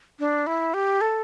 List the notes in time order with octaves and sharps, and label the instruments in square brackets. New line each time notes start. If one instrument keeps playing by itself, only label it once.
[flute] D4
E4
G4
A4